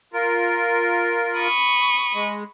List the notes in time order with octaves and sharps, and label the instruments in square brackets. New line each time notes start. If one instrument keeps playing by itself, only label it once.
[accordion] F4 A#4
[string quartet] B5 C#6 D#6
[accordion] G#3